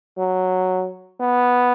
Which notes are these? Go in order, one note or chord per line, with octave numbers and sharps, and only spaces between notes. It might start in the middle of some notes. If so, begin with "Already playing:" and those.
F#3
B3